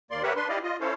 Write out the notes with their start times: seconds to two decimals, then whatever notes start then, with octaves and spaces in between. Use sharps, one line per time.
0.11 D#2 A#3 D5 C6
0.23 G4 A#4 B4 C#5 E5 F#5
0.36 D4 B4 C6
0.49 E4 G4 D5 D#5 F5
0.63 F4 D#5
0.80 C#4 E4 A4 C5 C#5 F5